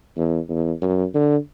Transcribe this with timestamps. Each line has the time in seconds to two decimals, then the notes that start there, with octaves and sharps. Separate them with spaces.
0.17 E2
0.49 E2
0.82 F#2
1.14 D3